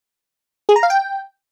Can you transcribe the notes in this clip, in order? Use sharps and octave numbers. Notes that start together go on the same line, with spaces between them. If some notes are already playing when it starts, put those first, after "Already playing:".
G#4
A#5
F5
G5